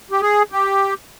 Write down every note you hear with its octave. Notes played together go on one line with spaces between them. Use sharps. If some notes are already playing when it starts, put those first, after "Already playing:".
G4
G#4
G4